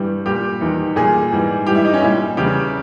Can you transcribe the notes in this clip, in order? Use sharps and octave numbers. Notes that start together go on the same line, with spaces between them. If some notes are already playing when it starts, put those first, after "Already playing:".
Already playing: G2 E3 G3
A#2 G3 G4
E2 D#3 G3
A#2 G3 G#4
G#2 E3 G3
G2 E3 G3 G4
E4
D#4
C#4
A#2 G3 E4
E2 C#3 G3 G4